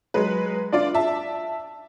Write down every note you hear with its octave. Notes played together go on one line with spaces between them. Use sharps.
F#3 G#3 B4
D4 F4 D5
E5 A5